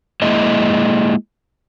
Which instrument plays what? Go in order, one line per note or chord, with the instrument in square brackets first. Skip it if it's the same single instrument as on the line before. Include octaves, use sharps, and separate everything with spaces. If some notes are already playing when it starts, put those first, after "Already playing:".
[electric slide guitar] G#3 A#3 E4 G#4 D#5 E5